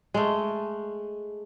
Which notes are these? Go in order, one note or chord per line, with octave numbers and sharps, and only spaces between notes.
G#3 A3